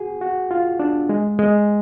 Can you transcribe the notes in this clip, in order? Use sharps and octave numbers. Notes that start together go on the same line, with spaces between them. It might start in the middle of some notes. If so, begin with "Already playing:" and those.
Already playing: F#4 G#4
F#4
F4
D4
G#3
G#3